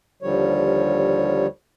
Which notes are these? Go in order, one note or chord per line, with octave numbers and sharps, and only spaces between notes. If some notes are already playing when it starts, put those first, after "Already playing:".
D#2 D3 F3 G3 C#5